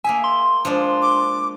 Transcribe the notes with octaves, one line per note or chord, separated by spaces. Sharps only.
A#3 G#4 E5 G#5
C6
F3 G#3 D4
D6